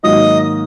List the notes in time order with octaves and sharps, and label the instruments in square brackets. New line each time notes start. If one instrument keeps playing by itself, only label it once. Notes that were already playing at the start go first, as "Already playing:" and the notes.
[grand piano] G#2 D#3 F#3 A#3 [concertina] D#5 D#6